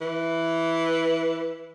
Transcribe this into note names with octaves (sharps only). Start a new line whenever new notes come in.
E3